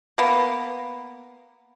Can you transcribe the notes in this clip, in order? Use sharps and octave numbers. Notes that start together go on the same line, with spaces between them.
A#3 B3